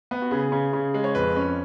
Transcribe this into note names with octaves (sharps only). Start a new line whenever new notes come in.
B3
F#4
C#3 G#4
C#3
C#3
G#3
C#5
F2 B4
C#4